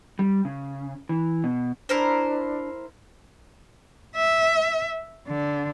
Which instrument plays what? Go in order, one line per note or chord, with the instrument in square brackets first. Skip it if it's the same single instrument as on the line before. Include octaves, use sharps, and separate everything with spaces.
[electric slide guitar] G3
C#3
E3
B2
[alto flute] D4 [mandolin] E4 A#4 C5
[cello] E5
D3